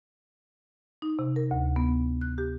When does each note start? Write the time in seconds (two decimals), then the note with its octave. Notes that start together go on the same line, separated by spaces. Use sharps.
1.02 D#4
1.19 C3
1.36 A#4
1.51 D2
1.76 B3
2.21 F#6
2.38 G4